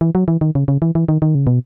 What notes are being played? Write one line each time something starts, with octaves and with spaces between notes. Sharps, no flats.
E3
F#3
E3
D#3
C#3
C#3
E3
E3
D#3
D#3
C#3
B2